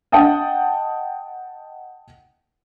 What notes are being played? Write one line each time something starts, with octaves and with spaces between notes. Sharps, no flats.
D#5 F#5 G5 A5 D#6